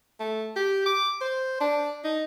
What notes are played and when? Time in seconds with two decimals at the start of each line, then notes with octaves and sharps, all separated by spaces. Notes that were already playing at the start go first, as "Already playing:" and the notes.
0.20 A3
0.56 G4
0.86 D6
1.21 C5
1.61 D4
2.04 D#4